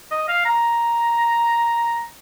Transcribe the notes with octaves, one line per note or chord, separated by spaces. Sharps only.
D#5
F5
A#5